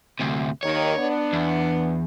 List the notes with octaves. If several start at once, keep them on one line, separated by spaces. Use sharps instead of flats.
D2 C3
D#2 D#3 C#5
B3 D4
E2